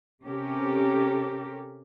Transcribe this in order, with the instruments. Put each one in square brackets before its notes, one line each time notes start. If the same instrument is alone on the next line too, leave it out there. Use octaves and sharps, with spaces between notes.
[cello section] C3 C#4 G4 A4 A#4